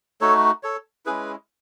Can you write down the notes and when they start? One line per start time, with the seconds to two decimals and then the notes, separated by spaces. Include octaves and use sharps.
0.21 A3 D#4 F#4 A4 C#5
0.63 A4 C#5
1.06 G#3 C#4 E4 G#4 B4